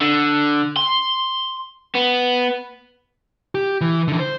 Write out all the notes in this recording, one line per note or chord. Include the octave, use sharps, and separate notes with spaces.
D3
C6
B3
G4
E3
D3 E3
C5